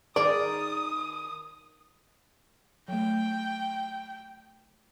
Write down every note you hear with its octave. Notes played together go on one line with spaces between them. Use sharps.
D#3 G#4 A#4 D5 D#6
F#3 A3 G5